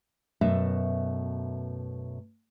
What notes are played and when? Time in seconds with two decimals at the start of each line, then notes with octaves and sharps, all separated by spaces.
0.41 F#2 B2 A3 E5